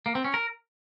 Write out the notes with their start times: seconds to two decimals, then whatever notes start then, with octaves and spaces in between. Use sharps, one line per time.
0.06 A#3
0.15 C4
0.24 C#4
0.34 A#4